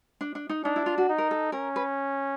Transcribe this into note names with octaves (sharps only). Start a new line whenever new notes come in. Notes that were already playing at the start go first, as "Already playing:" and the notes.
D4
D4
D#4
D4 D#4
E4
F4
F#4
D#4
A#4
A4
C#4 A#4
B4